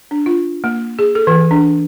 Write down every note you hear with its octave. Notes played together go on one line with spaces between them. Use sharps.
D4
F4
A#3
G#4
A4
E3
D4